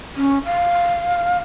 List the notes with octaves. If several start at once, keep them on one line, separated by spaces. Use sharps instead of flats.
C#4
F5